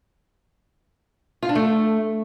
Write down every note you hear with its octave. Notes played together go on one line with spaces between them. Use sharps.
F4
D4
A3